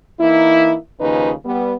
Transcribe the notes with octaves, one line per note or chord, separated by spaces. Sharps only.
E3 A#3 D#4 E4
D#2 C#3 F3 C#4 D#4 B4
G3 B3